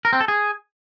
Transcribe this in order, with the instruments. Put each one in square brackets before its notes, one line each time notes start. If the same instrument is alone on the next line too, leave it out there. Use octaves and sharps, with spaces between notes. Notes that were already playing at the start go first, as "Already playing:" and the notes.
[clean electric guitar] A#4
C4
A4
G#4